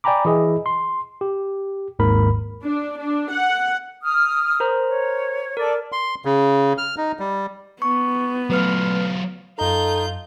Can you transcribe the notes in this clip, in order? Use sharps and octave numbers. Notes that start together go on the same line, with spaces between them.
D5 G5 G#5 A#5 B5 D6
E3 E4 G#4 D#5
C6
G4
G#1 D#2 G#2 A#4 B5
D4
D4
F#5
D#6 F6
A#4 C5 A#5
C#5
A4 A#4 D5 D6
C6
C#3
F6
D#4
G3
B3 C#6
F#3 A3 F4 B4 F6
F#2 D#4 F4 A4 A#5 G6